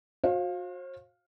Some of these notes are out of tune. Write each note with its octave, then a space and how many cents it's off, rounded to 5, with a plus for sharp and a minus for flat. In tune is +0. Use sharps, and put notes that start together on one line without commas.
F#4 -35 C5 +40 F5 +5